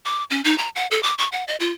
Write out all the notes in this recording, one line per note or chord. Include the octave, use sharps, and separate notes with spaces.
D6
C#4
D#4
A#5
F#5
A4
D6
C#6
F#5
D#5
F4